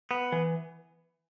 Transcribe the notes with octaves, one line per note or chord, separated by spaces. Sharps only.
B3
E3